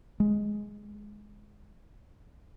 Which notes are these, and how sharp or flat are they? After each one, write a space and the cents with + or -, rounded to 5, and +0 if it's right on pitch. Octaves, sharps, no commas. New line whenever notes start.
G#3 +5